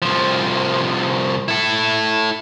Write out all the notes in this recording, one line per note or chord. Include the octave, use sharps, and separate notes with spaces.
C2 F3
E4 A4